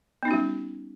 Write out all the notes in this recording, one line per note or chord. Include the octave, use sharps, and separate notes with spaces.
G3 B3 C#4 D#4 F#4